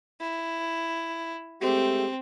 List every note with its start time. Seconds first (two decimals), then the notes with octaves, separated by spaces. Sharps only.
0.20 E4
1.61 G#3 A3 C4 G4